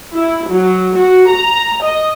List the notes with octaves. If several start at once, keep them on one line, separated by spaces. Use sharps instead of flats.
E4
F#3
F#4
A#5
D#5